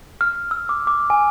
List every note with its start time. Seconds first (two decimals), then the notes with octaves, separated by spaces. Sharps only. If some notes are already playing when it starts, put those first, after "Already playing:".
0.21 F6
0.51 E6
0.69 D6
0.87 D6
1.10 G#5